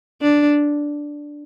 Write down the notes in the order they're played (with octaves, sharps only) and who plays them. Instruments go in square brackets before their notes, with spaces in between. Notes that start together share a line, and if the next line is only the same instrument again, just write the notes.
[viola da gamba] D4